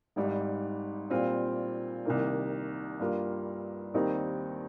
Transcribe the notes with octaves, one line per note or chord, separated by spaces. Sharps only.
G#1 G#2 G3
A#2 G3 C4 F4
C2 C3 D#3 A#3
G2 G3 A#3 F4
D#2 D#3 G3 C4 D#4